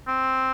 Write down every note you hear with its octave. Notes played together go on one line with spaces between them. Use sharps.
C4